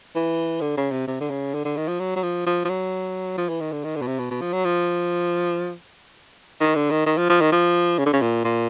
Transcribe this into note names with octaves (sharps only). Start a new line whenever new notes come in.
E3
D3
C#3
C3
C3
D3
C#3
D3
D3
D#3
F3
F#3
F#3
F3
F3
F3
F#3
F3
E3
D#3
D3
D#3
D3
B2
C3
B2
B2
F3
F#3
F3
D#3
D3
D#3
D#3
F3
F3
D#3
F3
C#3
D3
C#3
A#2
A#2